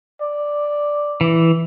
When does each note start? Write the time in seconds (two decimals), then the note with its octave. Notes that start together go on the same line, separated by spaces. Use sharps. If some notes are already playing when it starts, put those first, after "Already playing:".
0.21 D5
1.21 E3